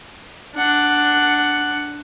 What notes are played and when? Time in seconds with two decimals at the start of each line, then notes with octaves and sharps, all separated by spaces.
0.56 D4 F#5